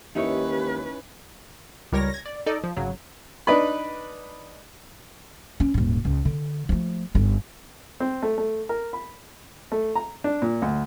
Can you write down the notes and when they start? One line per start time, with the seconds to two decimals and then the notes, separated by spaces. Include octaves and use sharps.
0.15 D#2 C#4 D#4 E4 G4 B4 C#5
1.92 C#2 G3 A#4 C#5 A#6
2.10 G#6 A#6
2.25 D5
2.46 D#4 A4 D5 D#5
2.64 F3
2.77 G#1 C#3 F#3
3.47 D4 D#4 B4 B5
5.60 C#4
5.74 D#1 G#2
6.05 C#2
6.25 D3
6.69 F3 A3
7.15 G1 C#4
8.00 C4
8.23 A3
8.38 A3
8.69 A#4
8.93 B5
9.72 A3
9.95 A#5
10.24 D4
10.42 A#2
10.62 D2